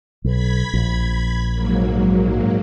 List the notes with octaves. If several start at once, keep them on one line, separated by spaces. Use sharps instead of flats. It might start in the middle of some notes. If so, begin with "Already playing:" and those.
B1 B5 G#6 B6
A#1
G#2 F#3 A#3